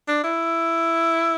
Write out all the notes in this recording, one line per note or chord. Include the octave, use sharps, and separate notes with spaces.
D4
E4